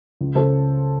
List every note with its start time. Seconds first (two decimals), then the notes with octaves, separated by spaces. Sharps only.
0.21 C#2
0.35 C#3 A4 C5